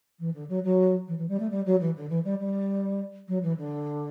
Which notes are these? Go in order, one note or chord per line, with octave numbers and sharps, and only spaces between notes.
E3
D3
F#3
F#3
E3
E3
G3
A3
G3
F#3
E3
D3
E3
G3
G3
F#3
E3
D3